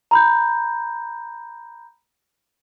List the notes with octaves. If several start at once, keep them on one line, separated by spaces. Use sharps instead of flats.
A#5 B5 G6